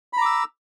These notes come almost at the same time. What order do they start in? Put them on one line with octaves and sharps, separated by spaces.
B5 A#5 D6 E6